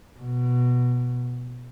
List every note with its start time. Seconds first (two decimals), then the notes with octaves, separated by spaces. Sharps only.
0.20 B2